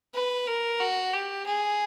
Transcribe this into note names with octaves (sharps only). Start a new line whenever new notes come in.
B4
A#4
F#4
G4
G#4